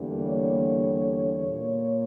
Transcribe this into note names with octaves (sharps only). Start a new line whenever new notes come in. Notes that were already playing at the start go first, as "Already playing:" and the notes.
Already playing: E2 D3 G3 A#3
C#5
A#2 A#3